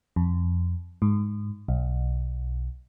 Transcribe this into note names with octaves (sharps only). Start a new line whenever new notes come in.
F2
G#2
B1